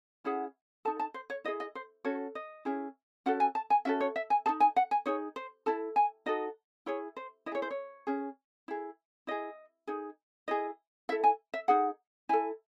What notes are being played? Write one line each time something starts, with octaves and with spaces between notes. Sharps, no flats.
C#4 E4 G#4 F#5
D#4 A4 A5
A5
C5
C#5
E4 G#4 D#5
D#5
C5
C#4 F#4 A4 C#5
D#5
C#4 E4 G#4
C#4 F#4 A4 F#5
G#5
A5
G#5
C#4 F#4 A4 E5
C#5
E5
G#5
G#4 A5
D#4
G#5
F#5
G#5
D#4 G#4 C#5
C5
E4 A4 A5
G#5
D#4 F#4 A4 D#5
E4 G#4 C#5
C5
E4 D#5
G#4 C#5
C5
C#5
C#4 G#4
E4 G#4
E4 G#4 D#5
D#4 G#4
E4 G#4 D#5
E4 A4 E5
G#5
E5
D#4 G#4 F#5
E4 A4 G#5